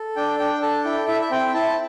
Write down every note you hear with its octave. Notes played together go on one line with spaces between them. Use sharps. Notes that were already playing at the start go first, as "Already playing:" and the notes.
Already playing: A4
D4 G5
D4 G5
A4 A5
E4 G5
E4 E5
E5
C4 G5
E4 A5